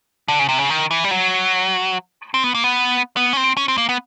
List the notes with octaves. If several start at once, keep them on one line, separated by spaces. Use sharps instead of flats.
D3
C#3
C3
C#3
D#3
E3
G3
F#3
C4
B3
A#3
B3
B3
C#4
C4
C#4
C4
A#3
B3